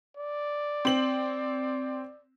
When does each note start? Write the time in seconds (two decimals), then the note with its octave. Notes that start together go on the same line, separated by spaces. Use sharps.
0.17 D5
0.85 C4 F#7